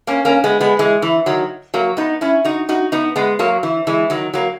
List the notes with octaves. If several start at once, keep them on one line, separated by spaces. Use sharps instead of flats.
A#3 C#4
A#3 C#4
G#3 B3
G#3 B3
E3 G#3
E3
D#3 F#3
F#3 A#3
B3 D#4
C#4 E4
D#4 F#4
D#4 F#4
B3 D#4
G#3 B3
F#3 A#3
E3
E3 G#3
D#3 F#3
F#3 A#3